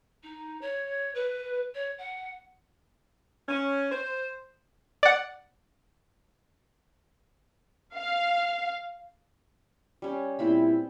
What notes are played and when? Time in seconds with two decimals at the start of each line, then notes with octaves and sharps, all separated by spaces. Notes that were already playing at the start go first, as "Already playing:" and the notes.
0.23 D#4
0.61 C#5
1.14 B4
1.74 C#5
1.98 F#5
3.49 C#4
3.92 C5
5.03 D5 F#5
7.94 F5
10.02 G3 C#4
10.39 A#2 G3 B3 C4 E4 B5